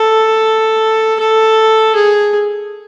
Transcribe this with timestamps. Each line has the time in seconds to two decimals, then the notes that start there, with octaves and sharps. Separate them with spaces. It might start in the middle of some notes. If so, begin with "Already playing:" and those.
Already playing: A4
1.20 A4
1.95 G#4